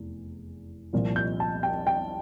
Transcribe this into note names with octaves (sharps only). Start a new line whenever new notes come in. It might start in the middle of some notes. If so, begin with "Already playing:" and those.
Already playing: F1 E2
C2 A#2 F3
G6
A5
G5
G5